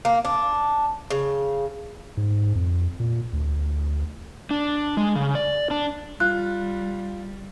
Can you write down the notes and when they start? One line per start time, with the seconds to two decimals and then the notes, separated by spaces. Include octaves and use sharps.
0.05 A#3
0.25 D4
1.11 C#3
2.17 G#2
2.55 F2
3.00 A#2
3.33 D2
4.51 D4
4.97 G#3
5.15 C#3
5.35 D5
5.71 D4
6.20 G3 F4 F#6